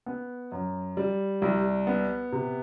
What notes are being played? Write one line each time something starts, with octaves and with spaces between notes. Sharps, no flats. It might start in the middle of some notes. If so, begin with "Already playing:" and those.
B3
F#2
G3
C2
B3
C3